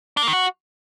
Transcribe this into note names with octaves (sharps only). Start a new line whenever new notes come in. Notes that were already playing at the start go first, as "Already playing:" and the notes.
D4
A#3
D#3
F#4